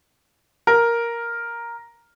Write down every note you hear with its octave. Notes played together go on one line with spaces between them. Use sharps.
A#4